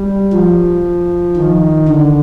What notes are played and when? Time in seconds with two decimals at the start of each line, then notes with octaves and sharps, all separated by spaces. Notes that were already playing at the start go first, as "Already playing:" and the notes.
Already playing: G3
0.33 F3
1.36 D#3
1.89 D3